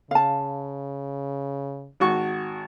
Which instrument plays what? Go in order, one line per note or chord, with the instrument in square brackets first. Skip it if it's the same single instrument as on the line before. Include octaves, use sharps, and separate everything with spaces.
[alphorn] C#3 [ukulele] F5 A5
[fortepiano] G#1 F#4 C#6